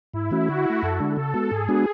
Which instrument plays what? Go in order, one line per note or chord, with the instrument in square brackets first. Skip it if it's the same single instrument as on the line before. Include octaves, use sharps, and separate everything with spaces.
[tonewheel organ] G#2 [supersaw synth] E4
[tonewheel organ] E3 A3 C#4 F#4
[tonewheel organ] D3 [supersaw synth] F#4
[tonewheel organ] A3 E4
[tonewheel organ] F#2 [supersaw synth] A4
[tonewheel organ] D3 G#3 D4
[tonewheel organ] C#3 [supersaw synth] A4
[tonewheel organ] G#3 B3 F#4
[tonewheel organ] G#2 [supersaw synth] G#4
[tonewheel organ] G#3 B3 D4 F#4